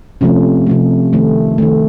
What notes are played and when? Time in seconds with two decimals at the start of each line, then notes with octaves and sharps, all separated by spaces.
0.21 C3 F3 A3 C#4
0.67 C3 F3 A3
1.13 D#3 A3
1.58 D#3 A3